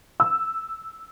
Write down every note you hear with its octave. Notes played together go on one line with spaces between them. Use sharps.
E6